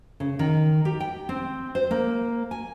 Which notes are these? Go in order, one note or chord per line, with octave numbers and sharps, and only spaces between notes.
C#3
D#3
G4
G5
C4
C5
A#3
G#5